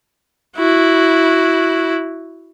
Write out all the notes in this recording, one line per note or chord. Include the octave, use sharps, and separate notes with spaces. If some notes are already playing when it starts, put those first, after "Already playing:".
E4 F#4